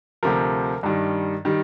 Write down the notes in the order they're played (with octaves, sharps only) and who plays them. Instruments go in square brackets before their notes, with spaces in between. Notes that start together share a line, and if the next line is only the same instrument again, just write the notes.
[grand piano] D2 C3 F3 A#4
G2 D#3 G3
D#3 G3